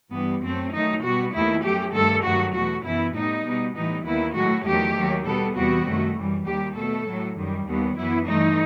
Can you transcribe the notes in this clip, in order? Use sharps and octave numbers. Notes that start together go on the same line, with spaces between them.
G2 E3 G3 B3
F#2 F#3 A3 C4
F#2 D#3 F#3 A3 D#4
B2 G3 B3 F#4
D#2 D#3 A3 E4
F#2 F#3 A3 G4
G2 D#3 A3 A4
G2 D#3 F#3 A3 F#4
E2 B2 A3 F#4
F#2 E3 B3 E4
A2 G3 B3 D#4
B2 G3 B3
A2 E3 G3 B3 D#4
D#2 D#3 G3 B3 E4
A2 F#3 A3 F#4
E2 D#3 F#3 A3 G4
D#2 D#3 F#3
B2 G3 B3 A4
E2 C3 E3 G3 B3 F#4
F#2 D#3 A3
F#2 E3 G3
D#2 D#3 G3 G4
B2 A3 A4
A2 F#3 A3
F#2 D#3 G3
D#2 D#3 G3 B3
F#2 E3 B3 E4
G2 E3 A3 D#4